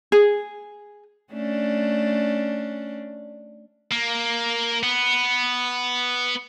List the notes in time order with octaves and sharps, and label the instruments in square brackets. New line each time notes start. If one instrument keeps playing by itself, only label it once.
[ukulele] G#4
[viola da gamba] A3 C#4 D4
[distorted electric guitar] A#3
B3